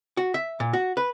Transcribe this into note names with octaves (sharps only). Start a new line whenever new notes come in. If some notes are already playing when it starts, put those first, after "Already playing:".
F#4
E5
A#2
F#4
B4